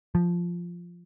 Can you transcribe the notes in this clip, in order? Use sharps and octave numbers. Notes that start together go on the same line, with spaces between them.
F3